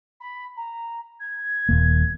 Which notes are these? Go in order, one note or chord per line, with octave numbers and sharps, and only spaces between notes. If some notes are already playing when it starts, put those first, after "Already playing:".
B5
A#5
G#6
D#1 A#3